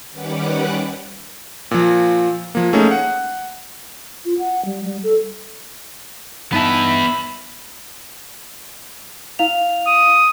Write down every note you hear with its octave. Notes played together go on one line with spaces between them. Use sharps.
D#3 G3 C#4 B4 F#5 D6
A#2 F3
F3 A#3
A3 A#3 C#4 D#4 G#4
F#5
F4
F#5
G3
G3
A4
G2 B3 D#4 E5 A5 B5
E4 F5 F7
D#6